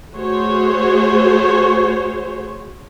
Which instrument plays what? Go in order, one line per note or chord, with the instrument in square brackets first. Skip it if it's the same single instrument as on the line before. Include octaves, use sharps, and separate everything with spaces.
[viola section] A3 F#4 G#4 C5 C#5